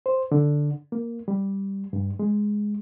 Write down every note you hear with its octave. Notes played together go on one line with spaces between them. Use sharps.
C5
D3
A#3
G3
G2
G#3